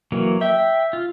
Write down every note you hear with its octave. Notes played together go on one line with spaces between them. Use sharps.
E3 F#3 A#3
E5 G5
F4